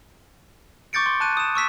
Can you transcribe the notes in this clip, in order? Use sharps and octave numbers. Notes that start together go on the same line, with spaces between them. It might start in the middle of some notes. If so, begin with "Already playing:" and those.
C#6 D6 G6 A6 C#7 D7
C6
A5 F#6 D#7
D#6 E7
C#6 E6 B6 E7